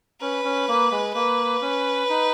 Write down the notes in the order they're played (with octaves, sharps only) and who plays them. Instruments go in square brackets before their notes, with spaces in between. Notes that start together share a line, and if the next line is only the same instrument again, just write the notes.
[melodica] C#4 [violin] B4
[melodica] C#4
A#3
G#3
[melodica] A#3 [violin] B4
[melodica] C#4
D#4